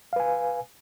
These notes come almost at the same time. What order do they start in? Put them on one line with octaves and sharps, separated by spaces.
F5 B4 G#5